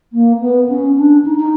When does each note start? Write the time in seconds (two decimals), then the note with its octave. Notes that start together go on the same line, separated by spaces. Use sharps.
0.13 A#3
0.40 B3
0.69 C#4
0.97 D4
1.25 D#4
1.39 D#4